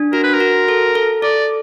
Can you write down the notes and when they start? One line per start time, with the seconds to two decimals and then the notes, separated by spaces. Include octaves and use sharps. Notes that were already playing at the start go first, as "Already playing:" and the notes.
Already playing: D4
0.13 F#4 A#4
0.24 B4
0.34 A#4
0.40 F#4
0.68 A4
0.95 A4
1.22 A4 D5